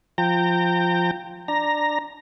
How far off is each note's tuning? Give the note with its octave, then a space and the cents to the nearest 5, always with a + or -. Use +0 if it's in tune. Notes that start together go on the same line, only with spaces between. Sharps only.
F3 +0 G5 +0 A#5 -30
D4 +15 A#5 +0